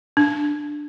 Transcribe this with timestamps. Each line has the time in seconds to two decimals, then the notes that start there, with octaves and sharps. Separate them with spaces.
0.17 D4